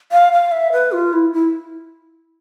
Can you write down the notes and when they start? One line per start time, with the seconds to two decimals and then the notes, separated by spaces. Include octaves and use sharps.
0.12 F5
0.33 F5
0.52 E5
0.72 B4
0.92 F4
1.13 E4
1.33 E4